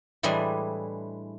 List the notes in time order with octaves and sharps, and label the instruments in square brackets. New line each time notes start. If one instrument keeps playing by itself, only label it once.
[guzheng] A2 E3 G3 G#3 D4 G#4